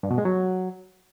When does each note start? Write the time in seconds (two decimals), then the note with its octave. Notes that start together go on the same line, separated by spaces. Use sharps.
0.03 G2
0.11 B2
0.18 G#3
0.25 F#3